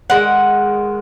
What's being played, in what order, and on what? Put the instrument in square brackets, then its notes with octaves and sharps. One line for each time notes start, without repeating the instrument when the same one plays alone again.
[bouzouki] D#3 G#3 F#5